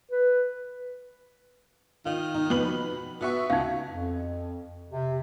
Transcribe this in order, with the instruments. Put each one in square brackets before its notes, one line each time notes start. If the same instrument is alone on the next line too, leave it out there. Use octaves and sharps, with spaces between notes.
[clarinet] B4
[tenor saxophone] D#3 [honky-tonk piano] F4
[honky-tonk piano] D#4
F2 B4 F#7
[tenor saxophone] B2 [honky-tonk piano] B5
[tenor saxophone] B3 [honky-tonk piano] F#4 E5 C#6
[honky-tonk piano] C#2 [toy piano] D#4 F5
[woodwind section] F2
C3